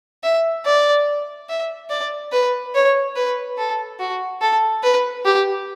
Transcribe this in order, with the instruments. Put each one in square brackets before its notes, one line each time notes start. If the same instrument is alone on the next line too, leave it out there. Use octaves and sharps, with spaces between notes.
[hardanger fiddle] E5
D5
E5
D5
B4
C#5
B4
A4
F#4
A4
B4
G4